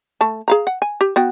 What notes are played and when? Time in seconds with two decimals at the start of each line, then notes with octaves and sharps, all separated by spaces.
0.21 A3 A5
0.48 G#4 F5 A#5
0.67 F#5
0.82 G#5
1.01 G4
1.16 B3 F#4 G5